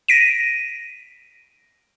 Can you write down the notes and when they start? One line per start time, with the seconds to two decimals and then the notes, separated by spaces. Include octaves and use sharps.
0.08 A#6 B6 D7 D#7